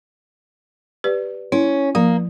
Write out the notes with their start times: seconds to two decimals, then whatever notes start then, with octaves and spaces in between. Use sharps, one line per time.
1.04 G4 B4 D5
1.52 C#4 E4
1.95 F3 A#3